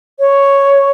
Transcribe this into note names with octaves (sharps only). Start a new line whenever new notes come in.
C#5